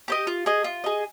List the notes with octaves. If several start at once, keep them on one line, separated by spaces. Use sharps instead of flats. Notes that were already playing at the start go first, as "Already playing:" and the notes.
G4 C5 D#5
F4
G#4 D#5
F4
G#4 D#5